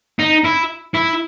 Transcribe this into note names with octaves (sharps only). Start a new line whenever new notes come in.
D#4
E4
E4